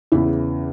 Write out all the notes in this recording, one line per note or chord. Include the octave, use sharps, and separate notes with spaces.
E2 C#3 E3 E4